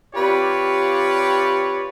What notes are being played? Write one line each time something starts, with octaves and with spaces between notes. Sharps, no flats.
C3 F4 G4 B4 C#5 D5